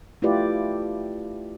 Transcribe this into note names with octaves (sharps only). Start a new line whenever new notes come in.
A3 E4 F4 G4 B4 D5